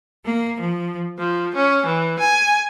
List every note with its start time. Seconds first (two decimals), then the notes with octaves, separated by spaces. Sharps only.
0.25 A#3
0.59 F3
1.19 F3
1.54 C#4
1.86 E3
2.19 G#5